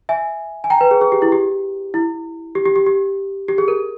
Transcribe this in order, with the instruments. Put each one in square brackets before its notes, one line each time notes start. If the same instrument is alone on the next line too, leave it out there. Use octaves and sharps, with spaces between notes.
[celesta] E5 G#5
G#5
G5 A#5
B4
G#4
G#4
G4
E4
G4
E4
G4
G4
G4
G4
G4
G#4
A#4